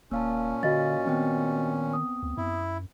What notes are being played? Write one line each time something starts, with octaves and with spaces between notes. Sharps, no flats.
D#1 A#2 A#3 C#4 F5 A5
D3 F#4 D#5 F5 A6
D#3 B3 C4 G5
D#6
D2
F#2 E4